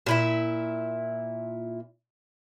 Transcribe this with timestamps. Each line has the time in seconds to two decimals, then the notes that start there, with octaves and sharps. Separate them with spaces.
0.06 A#2 E4 E5